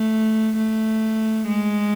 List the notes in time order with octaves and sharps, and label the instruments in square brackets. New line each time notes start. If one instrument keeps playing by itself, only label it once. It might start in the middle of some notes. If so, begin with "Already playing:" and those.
Already playing: [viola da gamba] A3
A3
G#3